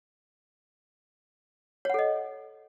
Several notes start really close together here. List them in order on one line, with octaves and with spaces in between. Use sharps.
C#5 F#5 A4 D#5